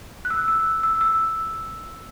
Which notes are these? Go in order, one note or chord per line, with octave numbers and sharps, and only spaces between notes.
F#6
E6
E6
E6
E6